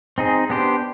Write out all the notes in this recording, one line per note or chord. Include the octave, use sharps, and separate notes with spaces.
C4 D#4 G#4
B3 D4 G4 C5